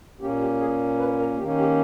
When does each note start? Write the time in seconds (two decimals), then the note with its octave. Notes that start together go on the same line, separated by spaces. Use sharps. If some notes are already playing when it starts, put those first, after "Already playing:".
0.21 A#2 A#3 C#4 G4
0.40 G4
0.61 G#4
0.99 B4
1.19 A#4
1.38 D#3 A#3 C#4 G4
1.58 G4